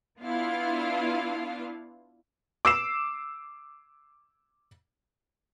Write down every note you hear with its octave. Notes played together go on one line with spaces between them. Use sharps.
B3 D4 E4 F4 F5
D6 E6 C7 E7